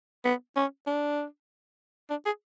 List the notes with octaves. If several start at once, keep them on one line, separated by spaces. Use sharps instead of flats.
B3
C#4
D4
D4
G#4